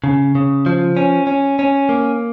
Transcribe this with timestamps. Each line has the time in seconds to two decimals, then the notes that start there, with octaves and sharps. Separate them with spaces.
0.04 C#3
0.35 C#3
0.66 F3
0.97 C#4
1.27 C#4
1.59 C#4
1.89 A#3